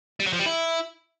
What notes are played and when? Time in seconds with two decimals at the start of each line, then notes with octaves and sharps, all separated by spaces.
0.20 G3
0.26 F#3
0.33 F3
0.39 G3
0.46 E4